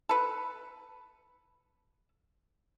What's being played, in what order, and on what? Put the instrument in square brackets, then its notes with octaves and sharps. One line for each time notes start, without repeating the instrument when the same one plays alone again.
[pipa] A4 B4